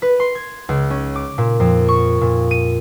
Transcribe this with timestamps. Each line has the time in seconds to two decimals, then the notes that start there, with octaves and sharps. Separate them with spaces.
0.02 B4
0.20 C6
0.35 G#6
0.69 C#2
0.90 C#4
1.16 D6
1.38 A#2
1.60 F2
1.88 C#6
2.21 A#2
2.51 D#7